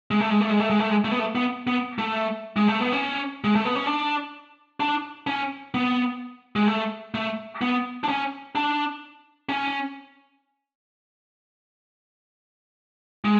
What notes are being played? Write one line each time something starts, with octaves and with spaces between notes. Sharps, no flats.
G#3
A3
G#3
A3
G#3
A3
G#3
A3
G#3
A3
B3
A3
B3
B3
A3
G#3
A3
B3
C#4
G#3
A3
B3
C#4
D4
D4
C#4
B3
G#3
A3
A3
B3
D4
C#4
D4
C#4
G#3